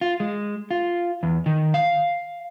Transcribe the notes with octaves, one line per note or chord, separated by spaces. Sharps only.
F4
G#3
F4
E2
D#3
F5